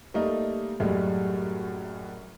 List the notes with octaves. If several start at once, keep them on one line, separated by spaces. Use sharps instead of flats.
G3 A3 A#3 D#4
F#2 A2 G3 G#3